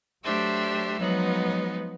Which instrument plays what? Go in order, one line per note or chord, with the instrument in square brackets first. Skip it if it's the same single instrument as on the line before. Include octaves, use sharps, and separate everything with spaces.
[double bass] F#3 [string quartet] A3 D4 G4 C5 E5
[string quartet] F3 G#3 B3 D#4 [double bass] F#3